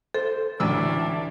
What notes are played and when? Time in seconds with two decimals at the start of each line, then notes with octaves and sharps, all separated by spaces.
0.14 A4 C5
0.60 A1 D2 A2 E3 D4 D5 E6